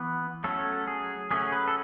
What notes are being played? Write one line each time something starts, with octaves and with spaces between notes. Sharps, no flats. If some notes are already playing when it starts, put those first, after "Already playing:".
Already playing: E3 B3
F#3 A3 C#4 A4
G#4
F#3 A3 C#4 G#4
B4
A4